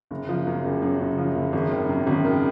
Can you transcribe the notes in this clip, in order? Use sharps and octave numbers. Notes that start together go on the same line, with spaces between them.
F#1
F3
F#2
F#1
F#2
F#1
F3
F#1
G#1
D#3
F#2
G#1
D#3